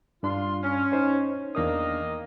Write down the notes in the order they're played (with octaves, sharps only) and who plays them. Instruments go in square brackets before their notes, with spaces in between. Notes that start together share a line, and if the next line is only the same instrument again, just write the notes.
[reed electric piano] G2 D4 [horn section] F4 C6
[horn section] C#4
[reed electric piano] D#4 C5 C#5
[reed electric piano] E2 D4 D#6 [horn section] D#3 A#3 D#5